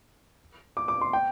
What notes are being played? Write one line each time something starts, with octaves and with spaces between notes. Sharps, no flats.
D6
D6
C6
G5